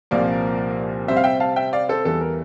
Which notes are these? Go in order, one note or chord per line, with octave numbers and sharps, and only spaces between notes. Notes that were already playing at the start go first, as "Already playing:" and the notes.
C2 A#2 F3 A#3 A#4 D5
C3 G3 C4 C5 E5
F5
E5 G5
F5 A5
E5 G5
D5 F5
A4 C5
E2 E3 G3 A4
A#4